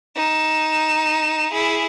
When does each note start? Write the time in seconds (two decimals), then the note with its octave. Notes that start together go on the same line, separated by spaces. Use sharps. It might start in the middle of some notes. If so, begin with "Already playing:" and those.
0.16 D#4 E7
1.52 E4 G#4